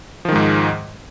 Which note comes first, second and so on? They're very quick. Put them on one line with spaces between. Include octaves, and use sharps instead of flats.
F3 D#3 G#3 G#2